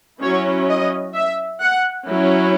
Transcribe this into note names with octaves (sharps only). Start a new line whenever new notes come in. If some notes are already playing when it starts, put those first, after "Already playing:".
F#3 C#4 E4 C#5
D#5
E5
F#5
F#3 C#4 E4